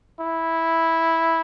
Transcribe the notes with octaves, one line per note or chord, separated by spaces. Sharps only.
E4